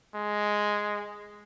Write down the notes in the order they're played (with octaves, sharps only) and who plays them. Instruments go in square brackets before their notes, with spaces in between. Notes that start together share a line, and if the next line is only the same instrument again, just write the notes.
[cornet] G#3